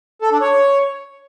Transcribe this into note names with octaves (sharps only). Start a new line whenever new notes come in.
A4
D4
C#5